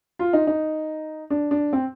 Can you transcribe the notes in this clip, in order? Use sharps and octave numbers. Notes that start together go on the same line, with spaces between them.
F4
D#4
D#4
D4
D4
C4